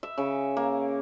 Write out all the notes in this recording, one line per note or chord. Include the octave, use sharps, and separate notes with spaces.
E5
C#3
A#3